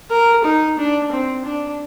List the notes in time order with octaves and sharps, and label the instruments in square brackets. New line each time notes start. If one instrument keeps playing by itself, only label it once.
[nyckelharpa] A#4
D#4
D4
C4
D4